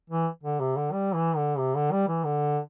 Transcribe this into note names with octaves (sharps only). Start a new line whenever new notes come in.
E3
D3
C3
D3
G3
E3
D3
C3
D3
G3
E3
D3